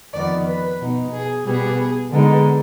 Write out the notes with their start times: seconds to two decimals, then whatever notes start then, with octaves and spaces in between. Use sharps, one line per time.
0.13 F2 D#3 B3 D#4 D5
0.46 B4
0.79 B2 B3 D#4
1.12 G#4
1.44 B2 G3 B3 G#4
2.10 D3 G#3 B3 D#4